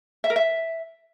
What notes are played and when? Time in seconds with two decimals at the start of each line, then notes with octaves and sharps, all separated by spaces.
0.24 E5
0.30 A#4
0.36 E5